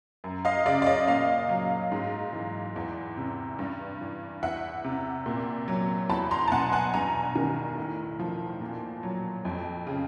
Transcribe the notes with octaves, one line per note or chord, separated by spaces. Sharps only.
F#2
D#5 F5
C#3 D5 E5
D5
C#5 D#5
A#2 D#5 F5
F#3
G#2
E3
E2
C3
G2
E3
E2 E5 F#5
C3
A#2
F#3
E2 A5 B5
A#5 C6
A5
B2 F#5 G#5
F#5 G#5
G2 G#5 A#5
D#3
A2
F3
A#2
F#3
F2
C#3